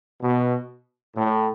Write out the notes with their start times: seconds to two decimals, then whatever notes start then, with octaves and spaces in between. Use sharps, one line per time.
0.21 B2
1.16 A2